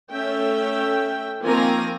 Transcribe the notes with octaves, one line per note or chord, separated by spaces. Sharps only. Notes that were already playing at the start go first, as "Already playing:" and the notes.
A3 C#4 E5 G5
D#3 F3 A#3 C4 G#5 A#5